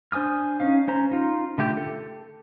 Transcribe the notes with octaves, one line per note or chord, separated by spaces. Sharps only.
D4 C5 G#5 D#6 F6
C#4 D#4 F5
C#4 C5 A#5
D#4 F4
D3 A3 G4 G6
A4